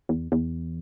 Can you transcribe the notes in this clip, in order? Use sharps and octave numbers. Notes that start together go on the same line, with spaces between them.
E2
E2